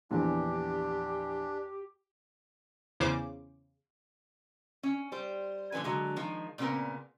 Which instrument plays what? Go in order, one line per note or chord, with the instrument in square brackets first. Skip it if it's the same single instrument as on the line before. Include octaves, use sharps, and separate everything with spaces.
[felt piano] A#1 E2 [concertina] D4 [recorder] G4
[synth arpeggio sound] E2 C#3 C5 D6
[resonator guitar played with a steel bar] C#4
G3 C5
A#2 D3 F3 B4 G#5
D3 F#3 G#3
D#3 F3 G#3
A#2 C#3 B3 C4 A#4